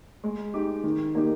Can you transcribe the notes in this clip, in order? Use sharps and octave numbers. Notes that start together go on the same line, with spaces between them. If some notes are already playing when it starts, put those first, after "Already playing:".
G#3
D#4 G4
D#3
A#3 D#4 G4